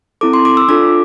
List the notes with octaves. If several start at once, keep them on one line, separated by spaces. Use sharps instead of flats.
C4 E4 A4 D6
C6
D6
E6
D4 F4 A4 D6